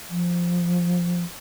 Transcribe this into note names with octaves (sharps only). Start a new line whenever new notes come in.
F3